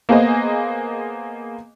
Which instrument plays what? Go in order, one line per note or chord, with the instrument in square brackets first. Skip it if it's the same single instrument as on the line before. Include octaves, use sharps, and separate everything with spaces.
[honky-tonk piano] A#3 B3 G#4 C5 D#5